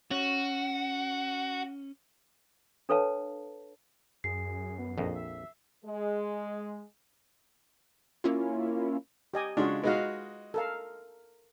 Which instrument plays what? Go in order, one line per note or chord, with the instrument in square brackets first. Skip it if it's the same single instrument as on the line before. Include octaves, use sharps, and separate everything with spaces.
[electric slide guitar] C#4 [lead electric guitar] F#4
[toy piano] D4 A4 B4 C#5 F5 A5
[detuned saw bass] F#2 [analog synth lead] G#4 [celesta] C7
[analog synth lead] B3
[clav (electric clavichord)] A#1 F2 [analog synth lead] D#5
[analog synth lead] E5
[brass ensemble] G#3
[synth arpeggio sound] A#3 C#4 E4 F4
[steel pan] G4 D#5 G#5
[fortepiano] C#3 G#3 D4 [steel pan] F4 F#4
[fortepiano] G#3 D#4 F#4 [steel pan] B4 F5
[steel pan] A4 A#4 F5